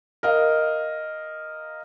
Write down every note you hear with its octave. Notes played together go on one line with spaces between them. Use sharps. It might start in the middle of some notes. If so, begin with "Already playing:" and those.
A#4 D#5 F5